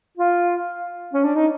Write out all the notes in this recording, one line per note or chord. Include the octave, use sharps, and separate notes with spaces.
F4
C#4
D4
D#4